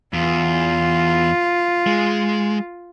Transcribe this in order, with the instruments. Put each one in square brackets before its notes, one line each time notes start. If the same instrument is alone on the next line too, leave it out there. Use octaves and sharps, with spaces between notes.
[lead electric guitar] E2 [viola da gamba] F4
[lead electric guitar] G#3